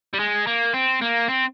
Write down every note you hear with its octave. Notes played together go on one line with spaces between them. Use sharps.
G3
G#3
A#3
C4
A#3
C4